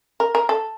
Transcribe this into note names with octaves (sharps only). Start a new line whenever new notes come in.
A#4
A#4
A4